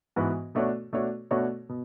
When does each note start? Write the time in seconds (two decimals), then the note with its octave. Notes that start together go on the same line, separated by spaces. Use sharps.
0.16 G#2 E3 B3 F#4 B4
0.55 B2 A3 D4 F#4 C#5
0.92 B2 A3 D4 F#4 C#5
1.31 B2 A3 D4 F#4 C#5
1.69 B2